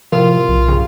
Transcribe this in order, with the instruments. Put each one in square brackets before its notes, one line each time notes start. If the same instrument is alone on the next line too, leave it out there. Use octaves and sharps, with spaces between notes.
[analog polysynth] A2 C3 [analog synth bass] F3 [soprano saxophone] F4 [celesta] A#4
[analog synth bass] B1
[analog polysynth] A#1 G2 C#3